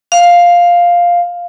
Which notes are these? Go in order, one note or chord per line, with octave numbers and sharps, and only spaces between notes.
F5